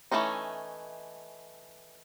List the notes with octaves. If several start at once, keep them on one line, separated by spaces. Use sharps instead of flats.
E3 F3 A3 C#4 D#4